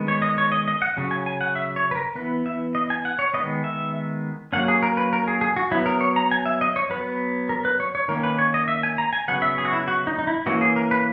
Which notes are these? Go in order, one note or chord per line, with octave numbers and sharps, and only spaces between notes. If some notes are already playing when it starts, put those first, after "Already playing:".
Already playing: D#3 G#3 B3
C#5
D#5
C#5
D#5
D#5
F#5
C#3 F#3 C#4
G#5
G#5
F#5
E5
C#5
B4
A#4
E3 B3 B4
E5
D#5
G#5
F#5
C#5
D#3 G#3 B3 D#5
E5
F#3 A#3 C#4 F#5
G#4
A#4
B4
A#4
G#4
G#4
F#4
F#3 B3 E4
A#4
C#5
A#5
G#5
E5
D#5
C#5
F#3 B3 B4
A#4
B4
C#5
C#5
D#3 A#3 C#4 A#4
B4
C#5
D#5
E5
G#5
A#5
G#5
C#3 F#3 B3 F#5
E5
G#4
F#4
E4
F#4
D#4
D#4
E4
E3 A#3 C#4 F#4
G#4
A#4
B4